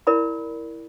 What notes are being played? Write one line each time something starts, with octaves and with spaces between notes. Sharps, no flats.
E4 A#4 D5 B5